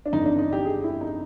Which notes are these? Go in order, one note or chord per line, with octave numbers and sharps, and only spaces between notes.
D4
G1 F2 C#3 E3 D#4
D4
D#4
G4
G#4
E4
D#4